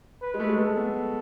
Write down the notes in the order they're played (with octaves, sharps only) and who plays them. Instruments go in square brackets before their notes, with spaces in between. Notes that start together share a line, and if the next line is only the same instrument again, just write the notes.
[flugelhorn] B4
[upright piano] G#3
A3
G#3
[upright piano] A3 [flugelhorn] A4
[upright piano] B3